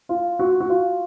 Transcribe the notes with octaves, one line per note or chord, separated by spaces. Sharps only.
F4
F#4
F#4
F4